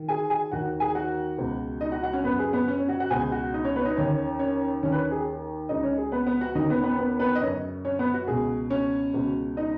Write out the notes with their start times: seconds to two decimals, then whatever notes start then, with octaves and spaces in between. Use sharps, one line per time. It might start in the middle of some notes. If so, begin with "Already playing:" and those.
Already playing: D#3
0.09 G#4 G#5
0.30 G#4 G#5
0.51 D#2 D#3 F#4 F#5
0.80 G#4 G#5
0.95 F#4 F#5
1.38 C#2 B2
1.81 D#4 D#5
1.92 F#4 F#5
2.03 F#4 F#5
2.13 C#4 C#5
2.24 F#2 C#3 B3 B4
2.39 G#4
2.53 B3 B4
2.68 C#4 C#5
2.78 C#4 C#5
2.88 F#4 F#5
3.00 F#4 F#5
3.10 C#2 B2 G#4 G#5
3.32 F#4 F#5
3.54 D#4 D#5
3.64 C#4 C#5
3.75 B3 B4
3.81 C#5
3.85 D#4 D#5
3.97 D#2 C#3 C#4 C#5
4.39 C#4 C#5
4.83 D#2 D#3 C#4 C#5
4.92 B4
4.97 C#4 C#5
5.11 G#4
5.69 C#2 C#3 D#4 D#5
5.83 C#4 C#5
5.98 G#4
6.12 B3 B4
6.27 B3 B4
6.41 F#4 F#5
6.55 D#2 C#3 D#4 D#5
6.70 B3 B4
6.84 B3 B4
6.99 B3 B4
7.19 B3 B4
7.35 D#5
7.41 F#2 C#3 C#4 C#5
7.85 C#4 C#5
7.99 B3 B4
8.14 F#4
8.28 C#2 B2 G#4
8.70 C#4 C#5
9.14 C#2 B2
9.57 D#4 D#5